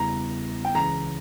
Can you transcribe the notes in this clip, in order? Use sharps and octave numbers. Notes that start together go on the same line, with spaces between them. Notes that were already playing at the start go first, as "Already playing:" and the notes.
Already playing: E2 C#3 G3 B3 E4 A#5
G5
C#2 C#3 E3 A#5